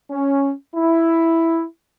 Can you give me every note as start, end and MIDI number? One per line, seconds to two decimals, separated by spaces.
0.11 0.52 61
0.74 1.64 64